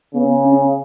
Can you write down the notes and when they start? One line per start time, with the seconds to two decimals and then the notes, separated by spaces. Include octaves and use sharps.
0.15 C#3 B3
0.45 C#4